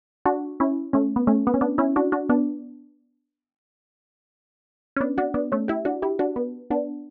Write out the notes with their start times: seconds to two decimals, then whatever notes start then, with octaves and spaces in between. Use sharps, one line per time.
0.25 D4 F#4
0.60 C#4 E4
0.93 A3 C#4
1.16 B3
1.27 A3 C#4
1.47 B3
1.54 C#4
1.61 B3 D4
1.78 C#4 E4
1.96 D4 F#4
2.12 D4 F#4
2.29 B3 D4
4.96 C#4
5.00 B3 D4
5.18 D4 F#4
5.34 B3 D4
5.52 A3 C#4
5.68 E4 G4
5.85 D4 F#4
6.02 E4 G4
6.19 D4 F#4
6.36 B3
6.70 B3 D4